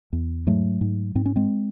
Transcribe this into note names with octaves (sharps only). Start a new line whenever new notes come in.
E2
G#2 F#3 A3
G#2
G#2 C4
C#4
G#3 C4